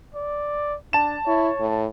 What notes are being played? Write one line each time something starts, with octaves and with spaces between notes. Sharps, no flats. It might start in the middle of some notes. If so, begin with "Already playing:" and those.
D5
D4 A5 E7
E4 C#5
A2